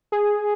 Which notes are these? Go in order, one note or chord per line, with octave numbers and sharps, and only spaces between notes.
G#4